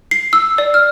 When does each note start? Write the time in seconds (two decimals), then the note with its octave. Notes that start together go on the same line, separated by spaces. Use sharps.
0.11 C7
0.33 E6
0.58 D5
0.74 F6